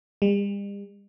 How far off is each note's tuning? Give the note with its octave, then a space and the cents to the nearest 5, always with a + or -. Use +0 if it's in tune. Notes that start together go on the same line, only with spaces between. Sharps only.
G3 +45